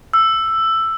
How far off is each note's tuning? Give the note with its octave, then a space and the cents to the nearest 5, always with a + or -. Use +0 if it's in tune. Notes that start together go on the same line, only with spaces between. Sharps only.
E6 +10